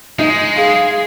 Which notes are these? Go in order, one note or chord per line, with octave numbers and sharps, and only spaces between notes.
G#3 D#4
G#4 F5